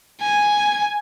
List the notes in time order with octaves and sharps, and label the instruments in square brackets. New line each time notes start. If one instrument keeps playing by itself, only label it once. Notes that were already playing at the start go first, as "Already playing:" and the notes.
[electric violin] G#5